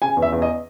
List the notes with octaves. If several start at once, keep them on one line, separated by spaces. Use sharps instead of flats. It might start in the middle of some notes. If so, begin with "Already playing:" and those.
C#3 G#5
E2
E5
E2
D#5